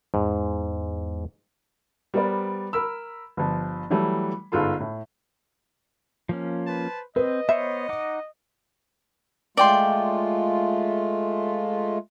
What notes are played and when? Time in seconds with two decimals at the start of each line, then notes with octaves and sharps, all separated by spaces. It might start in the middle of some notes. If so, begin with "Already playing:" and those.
0.14 E2 G#2
2.14 G3 B3 A#4 C5 D5
2.73 A#4 B5 E6
3.37 G1 F3
3.90 E3 F#3 G3 A3
4.52 G1 G#2 F4 A4 C6
4.80 A2
6.29 F3 A#3 C#4
6.67 B4 C5 A5
7.16 C4 B4 D#5
7.49 B3 C5 C#5 E5
7.89 D#4 F#5 D6
9.57 G#3 A3 F4 D5 G5 C6